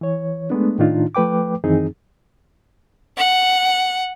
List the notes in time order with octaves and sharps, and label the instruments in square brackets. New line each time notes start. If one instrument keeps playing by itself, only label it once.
[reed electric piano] E3 C#5
G#3 A3 B3 D4
A2 D#3 D4 D#4 F4
F3 A3 B4 G5 D6
F#2 D#3 E3 C4 D#4 G#4
[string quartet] F#5